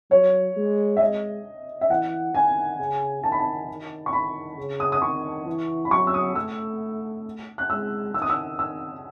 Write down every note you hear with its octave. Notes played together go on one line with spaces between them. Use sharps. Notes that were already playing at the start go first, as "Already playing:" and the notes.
F#3 C#5
G#3
E5
G#3 D#5
E5
E3 F#5
D#3 G#5
C#3
D#3 A5
B5
A5
D#3
C#6
D#3 B5
C#3
D#6
D#6
D#3 C#6
E3
B5
F#3 C#6
E6
D#6
A3 E6
F#6
G#3 E6
D#3 E6
D#6
E6
E6